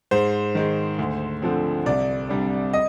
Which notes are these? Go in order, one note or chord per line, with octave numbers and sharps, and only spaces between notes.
G#2 C5
D#3 G#3
D2
D3 F3 C4
C2 D5
C3 G3 D4
D#5